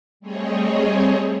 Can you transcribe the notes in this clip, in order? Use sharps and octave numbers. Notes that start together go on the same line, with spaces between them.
G3 A3 C4 G#4 C#5 D#5